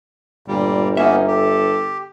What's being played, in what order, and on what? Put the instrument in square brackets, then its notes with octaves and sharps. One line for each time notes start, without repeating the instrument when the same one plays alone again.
[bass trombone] G1 [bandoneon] A#2 G3
[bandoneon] A#3 B3 C#4 [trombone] D#4 [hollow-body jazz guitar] E5
[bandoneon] G4 [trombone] A4